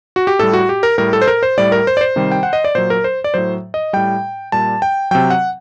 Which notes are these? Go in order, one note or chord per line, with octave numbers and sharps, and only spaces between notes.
F#4
G4
A2 G3 A4
F#4
G4
A#4
A2 G3 A#4
A4
C5
A#4
C5
A2 G3 D5
A#4
C5
D5
C5
C3 D#3 G3
G5
F#5
D#5
D5
A#2 F#3 C5
A#4
C5
D5
A2 F#3 C5
D#5
A2 G3 G5
A#2 G3 A5
G5
C3 F#3 G5
F#5